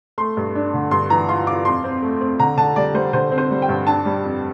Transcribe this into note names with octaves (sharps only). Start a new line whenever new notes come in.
A3 C6
G2
D4
D3
G2 C6
E3 A#5
F4 C6
F4 D6
F2 C6
C4
A3
C4
D3 A#5
D3 A5
G3 D5
G3 C5
D3 C5
C4
C5
G3
G5
G2
D4 A5
G3
F2